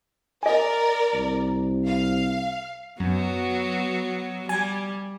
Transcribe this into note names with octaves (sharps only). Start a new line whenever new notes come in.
A#4 D5 D#5 G#5
C2
F5
F#2 F#3 B3 F#4
G3 G#5